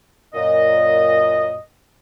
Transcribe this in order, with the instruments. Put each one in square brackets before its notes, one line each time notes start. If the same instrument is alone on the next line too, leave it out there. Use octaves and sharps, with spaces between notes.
[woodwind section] F#2 A#2 D#5